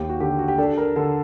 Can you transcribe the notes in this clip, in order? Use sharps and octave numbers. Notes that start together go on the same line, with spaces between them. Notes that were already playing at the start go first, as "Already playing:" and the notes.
Already playing: D#2 G4
F#4
D3 G4
F#4
G4
D4 A4
A#4
D3 A4